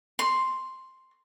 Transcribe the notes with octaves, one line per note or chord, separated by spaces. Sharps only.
C6